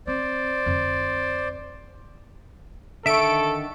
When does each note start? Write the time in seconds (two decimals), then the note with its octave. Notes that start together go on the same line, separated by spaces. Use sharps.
0.07 C4 C5 D5
0.66 F2 D3
3.06 D3 D#3 A4 E5 C#6 D7